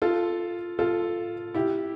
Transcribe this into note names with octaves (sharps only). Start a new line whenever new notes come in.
F4 A4
F4 A4
E4 G4